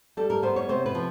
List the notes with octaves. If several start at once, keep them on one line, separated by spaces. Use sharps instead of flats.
G3 A4
A#4
B3 C5
C#5
C3 C5
B4
F3